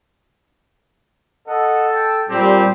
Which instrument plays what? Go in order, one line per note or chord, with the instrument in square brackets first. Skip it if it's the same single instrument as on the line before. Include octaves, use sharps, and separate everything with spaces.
[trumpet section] A4 [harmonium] D#5 F#5
[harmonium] G5
[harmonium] A#2 G3 [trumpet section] C4 G4